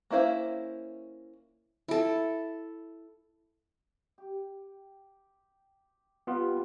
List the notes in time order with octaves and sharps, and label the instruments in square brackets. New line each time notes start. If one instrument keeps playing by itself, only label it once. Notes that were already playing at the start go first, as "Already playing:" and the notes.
[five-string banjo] A#3 C#4 E4 C5 F5
[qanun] E4 A4
[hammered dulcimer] G4
[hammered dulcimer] G3 G4 [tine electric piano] B3 F4